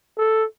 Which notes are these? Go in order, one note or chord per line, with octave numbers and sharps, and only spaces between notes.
A4